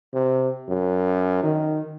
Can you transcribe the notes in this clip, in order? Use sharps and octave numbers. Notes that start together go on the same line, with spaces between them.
C3
F#2
D#3